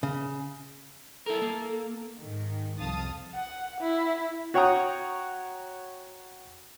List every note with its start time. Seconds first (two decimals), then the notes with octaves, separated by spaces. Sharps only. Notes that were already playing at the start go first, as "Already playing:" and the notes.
0.03 C#3
1.26 E4 A4 A#4
1.42 A#3
2.20 G#2 D#3
2.79 C2 F2 F5 A5 D#6 A6
3.35 F#5
3.81 E4
4.54 F#4 C#5 F#5 G5 A#5 D#6